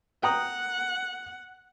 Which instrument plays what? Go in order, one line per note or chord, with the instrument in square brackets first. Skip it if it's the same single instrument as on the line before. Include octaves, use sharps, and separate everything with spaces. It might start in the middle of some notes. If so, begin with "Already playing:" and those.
[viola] F#5 [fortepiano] G5 A#5 D#6